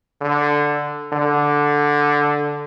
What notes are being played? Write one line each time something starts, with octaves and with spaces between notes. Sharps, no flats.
D3
D3